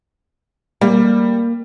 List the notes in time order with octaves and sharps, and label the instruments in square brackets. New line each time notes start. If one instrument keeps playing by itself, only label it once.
[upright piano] G3 [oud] A#3